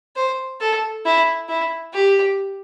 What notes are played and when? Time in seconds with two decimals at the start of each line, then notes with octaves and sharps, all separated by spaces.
0.16 C5
0.61 A4
1.06 E4
1.49 E4
1.94 G4